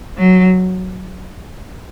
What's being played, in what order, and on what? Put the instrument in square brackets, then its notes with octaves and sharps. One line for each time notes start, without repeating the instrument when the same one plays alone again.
[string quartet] F#3